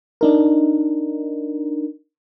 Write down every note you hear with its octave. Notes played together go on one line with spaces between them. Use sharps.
D4 D#4 A#4